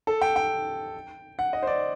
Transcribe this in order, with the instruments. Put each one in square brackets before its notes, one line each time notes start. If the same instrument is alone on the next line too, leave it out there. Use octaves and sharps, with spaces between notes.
[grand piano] A4
G5
G5
F#5
D#5
C5
D5